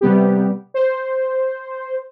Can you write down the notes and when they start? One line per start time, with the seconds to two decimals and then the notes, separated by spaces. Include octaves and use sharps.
0.01 C3 G3 B3 G4
0.74 C5